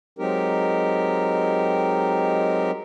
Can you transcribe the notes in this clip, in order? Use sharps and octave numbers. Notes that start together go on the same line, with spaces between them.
F#3 G#3 C4 D#4 G4 A#4